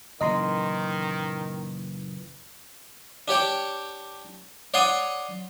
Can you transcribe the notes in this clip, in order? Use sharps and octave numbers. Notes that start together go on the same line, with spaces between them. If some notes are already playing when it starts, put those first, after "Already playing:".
F#1 A#2 D#3 E3 D#5 A#5 C6
D4 G4 C#5 G5
C#5 D5 F#5 C6 C#6 D#6